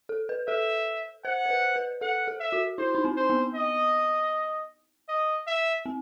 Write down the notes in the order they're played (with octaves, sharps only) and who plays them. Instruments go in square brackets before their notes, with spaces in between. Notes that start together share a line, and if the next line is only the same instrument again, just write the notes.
[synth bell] A4
B4
[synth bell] A4 [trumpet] E5
[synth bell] C5 [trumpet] F#5
[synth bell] C5
B4
B4
[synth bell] A4 [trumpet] F#5
[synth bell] A4
[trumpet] E5
[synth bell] F#4
[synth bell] E4 [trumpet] C5
[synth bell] D#4
C4
[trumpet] C5
[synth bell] B3
[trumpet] D#5
D#5
E5
[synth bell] C4